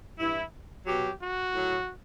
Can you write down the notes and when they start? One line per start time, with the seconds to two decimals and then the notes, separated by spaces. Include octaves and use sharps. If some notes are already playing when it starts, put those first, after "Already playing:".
0.19 G2 E3 E4
0.86 B2 F#3 G4
1.20 F#4
1.53 A2 F#3